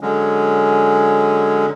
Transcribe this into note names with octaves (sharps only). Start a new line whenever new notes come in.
D3 F#3 G#3 C#4